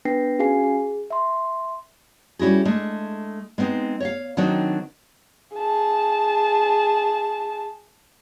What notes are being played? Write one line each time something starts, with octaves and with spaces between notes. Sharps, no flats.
B3 D4 B4 G5 A#6 C7
C#4 F#4 G#4 F5 G#5 C7
G#4
E5 C6
G3 C#4 E4 F#4 G#4
G#3 A3 D4
G#3 B3 C4 D4 D#4
C#5 E5 F5
D#3 F#3 C4 D4 D#4
G#4 A5